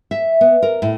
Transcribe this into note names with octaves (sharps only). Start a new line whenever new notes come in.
E5
B3
A#4
A2